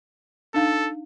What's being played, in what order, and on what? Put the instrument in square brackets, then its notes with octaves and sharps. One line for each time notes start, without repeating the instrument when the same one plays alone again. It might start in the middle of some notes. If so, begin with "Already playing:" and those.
[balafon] D4 D#4 F5 [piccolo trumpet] A4